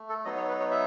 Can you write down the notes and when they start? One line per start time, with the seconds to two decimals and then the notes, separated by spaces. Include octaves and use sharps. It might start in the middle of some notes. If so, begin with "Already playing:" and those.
Already playing: A3
0.09 A4
0.25 F#3 B3 D#4 D#5
0.36 C#5
0.48 B4
0.60 C#5
0.71 E5